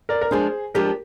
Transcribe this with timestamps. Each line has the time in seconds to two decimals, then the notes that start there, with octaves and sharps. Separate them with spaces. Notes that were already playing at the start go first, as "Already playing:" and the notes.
0.09 A#4 D5
0.21 A#4
0.31 F3 G#3 D4 G#4 C5
0.74 F3 G#3 D4 G4 A#4